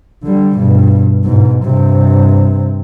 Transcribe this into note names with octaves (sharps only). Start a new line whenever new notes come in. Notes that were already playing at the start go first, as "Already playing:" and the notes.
D3 G3
G2 B2
G#2 B2
G2 C3